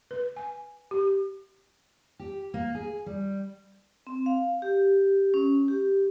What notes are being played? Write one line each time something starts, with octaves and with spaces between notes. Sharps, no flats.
B4
G#5
G4
G4
A#3
G#4
G3
C4
F5
G4
C#4
G4